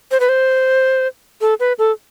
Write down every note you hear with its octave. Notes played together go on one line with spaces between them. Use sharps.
C5
B4
C5
A4
B4
A4